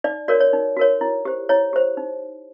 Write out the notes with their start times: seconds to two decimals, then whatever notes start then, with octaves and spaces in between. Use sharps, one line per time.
0.04 D#4 D5
0.28 F#4 A#4 C#5 D5
0.40 C#5
0.53 D#4
0.77 F#4 A#4 C#5
1.01 E4
1.25 G4 C5
1.49 E4 C#5
1.73 G4 C5
1.97 D#4